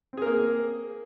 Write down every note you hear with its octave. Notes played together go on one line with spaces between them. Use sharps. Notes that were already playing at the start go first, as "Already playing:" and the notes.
A#3 C4 G#4 A#4